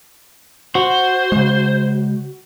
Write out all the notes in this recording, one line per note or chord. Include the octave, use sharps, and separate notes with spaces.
F#4 C5
C#3 G#3